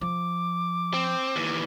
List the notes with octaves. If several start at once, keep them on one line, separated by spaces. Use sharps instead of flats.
F3 D6
C4
D#2 E3